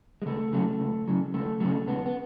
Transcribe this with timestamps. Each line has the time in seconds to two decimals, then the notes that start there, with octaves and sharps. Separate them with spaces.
0.22 G#3
0.26 C#2 A3
0.53 C#3 F#3
0.80 C#2
1.08 C#3 F#3
1.34 C#2 A3
1.60 C#3 F#3 A3
1.87 C#2 B3
2.06 B3